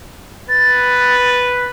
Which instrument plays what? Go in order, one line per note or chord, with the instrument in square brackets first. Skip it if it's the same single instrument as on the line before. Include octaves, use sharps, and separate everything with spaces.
[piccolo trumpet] B4 [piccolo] A6